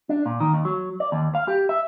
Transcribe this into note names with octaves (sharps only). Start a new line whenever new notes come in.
D4
A#2
D#3
D#2
F#3
D5
D#2
F5
G4
E5